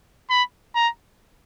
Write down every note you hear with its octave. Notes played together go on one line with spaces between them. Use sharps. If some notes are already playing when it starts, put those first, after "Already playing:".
B5
A#5